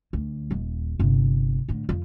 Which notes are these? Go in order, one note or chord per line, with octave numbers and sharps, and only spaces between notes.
D2
D#1 D#2
G1 C3
A2 D3
F2